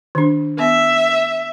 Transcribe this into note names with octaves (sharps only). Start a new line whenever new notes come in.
D#3 D4
B3 E5